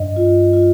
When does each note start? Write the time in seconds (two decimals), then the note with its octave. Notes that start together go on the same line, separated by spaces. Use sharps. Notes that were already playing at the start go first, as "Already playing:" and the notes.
Already playing: G2 D#5
0.16 F4
0.53 F4